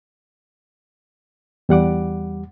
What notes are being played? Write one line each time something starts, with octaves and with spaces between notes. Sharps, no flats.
E2 G3 F#5 D6